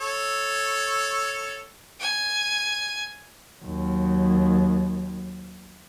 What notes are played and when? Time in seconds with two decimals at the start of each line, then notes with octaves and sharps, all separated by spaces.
0.01 A4 C#5
2.01 G#5
3.63 D#2 F#3